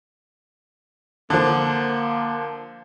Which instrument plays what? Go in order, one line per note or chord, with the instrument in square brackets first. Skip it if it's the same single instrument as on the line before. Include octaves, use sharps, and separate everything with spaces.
[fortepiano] D3 F3 [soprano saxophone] A#3